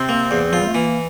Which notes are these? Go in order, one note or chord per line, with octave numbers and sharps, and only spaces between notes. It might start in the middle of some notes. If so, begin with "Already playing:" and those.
Already playing: C3 C4
A#3
E2
F3 F4
G3
A3
E3 A#3